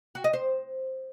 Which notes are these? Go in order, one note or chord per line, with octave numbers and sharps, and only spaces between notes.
F#4
D#5
C5